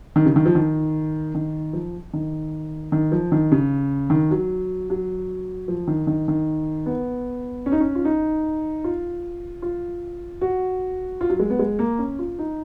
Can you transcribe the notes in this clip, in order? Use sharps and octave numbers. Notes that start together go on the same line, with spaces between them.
D#3
C#3
D#3
F3
D#3
D#3
F3
D#3
D#3
F3
D#3
C#3
D#3
F#3
F#3
F3
D#3
D#3
D#3
B3
C#4
D#4
C#4
F4
D#4
F4
F4
F#4
F4
F#3
G#3
B3
G#3
A#3
C#4
F4
D#4